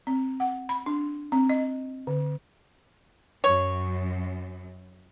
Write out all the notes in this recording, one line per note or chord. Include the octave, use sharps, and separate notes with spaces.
C4
F#5
B5
D4
C4
D#5
D3
F#2 C#5